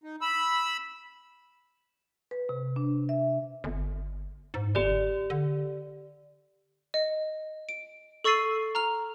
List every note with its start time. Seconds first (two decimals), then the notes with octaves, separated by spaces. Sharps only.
0.03 D#4
0.21 B5 E6
2.31 B4
2.49 C3
2.76 D4
3.09 E5
3.64 G1
4.54 G#2
4.75 G1 G4 D5
5.30 D3
6.94 D#5
7.69 D7
8.24 A4 C#6 E6 A6 C7 D#7
8.75 A#5 F6 F7